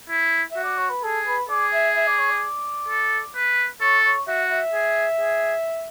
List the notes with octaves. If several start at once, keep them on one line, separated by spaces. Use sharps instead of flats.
E4
E5
F#4
D5
C#5
B4
G#4 A4
B4
G#4 D5
E5
E5
D5
C#5
D5
A4
B4
A4 C#5
C#5
F#4 E5
E5
G#4
G#4